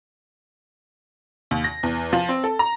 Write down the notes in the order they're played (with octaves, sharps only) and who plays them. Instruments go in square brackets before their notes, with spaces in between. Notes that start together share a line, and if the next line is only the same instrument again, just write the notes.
[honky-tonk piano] D#2
A#6
E2
F3
C4
A4
A#5